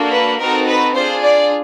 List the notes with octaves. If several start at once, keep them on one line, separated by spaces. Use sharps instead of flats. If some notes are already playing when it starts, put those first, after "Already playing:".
Already playing: A#3 D4 F#4 A4
B4
C4 D#4 F#4 A4 A#4
B4
D4 F4 G#4 C5
D5